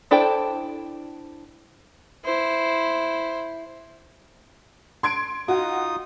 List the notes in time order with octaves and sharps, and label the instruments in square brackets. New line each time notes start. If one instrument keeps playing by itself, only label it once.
[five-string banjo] D4 E4 A4 C5 G5
[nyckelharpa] E4 C5
[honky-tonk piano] C6 G#6 D7
[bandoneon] D#4 F4 D#6 [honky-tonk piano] F#4